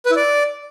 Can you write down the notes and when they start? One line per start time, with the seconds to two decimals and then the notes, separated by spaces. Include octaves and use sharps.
0.06 B4
0.11 E4
0.16 D5